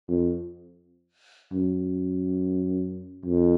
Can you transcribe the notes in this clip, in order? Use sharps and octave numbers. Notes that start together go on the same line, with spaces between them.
F2
F#2
F2